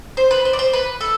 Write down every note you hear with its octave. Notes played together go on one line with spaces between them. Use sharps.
C5
B4
C5
D5
C5
B4
A4